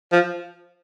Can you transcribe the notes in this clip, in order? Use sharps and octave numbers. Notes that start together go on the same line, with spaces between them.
F3